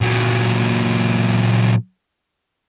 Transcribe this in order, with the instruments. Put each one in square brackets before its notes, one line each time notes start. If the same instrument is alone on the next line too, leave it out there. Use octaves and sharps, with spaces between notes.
[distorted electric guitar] A#2 F#3